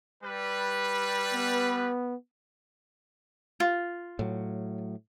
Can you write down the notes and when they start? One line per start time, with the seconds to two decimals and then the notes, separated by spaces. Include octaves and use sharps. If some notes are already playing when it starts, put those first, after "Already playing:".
0.23 G3 B4
1.33 B3
3.60 F4
4.19 A2 F#3